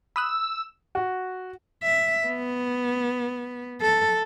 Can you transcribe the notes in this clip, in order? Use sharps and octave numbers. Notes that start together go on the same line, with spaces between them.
B5 D#6 E6 F#6
F#4
E5
B3
A4